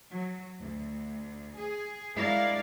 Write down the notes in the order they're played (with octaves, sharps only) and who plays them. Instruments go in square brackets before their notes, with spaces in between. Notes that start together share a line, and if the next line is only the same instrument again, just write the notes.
[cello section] F#3
D2
G#4
G#3 D4 E4 A#4 D5 F5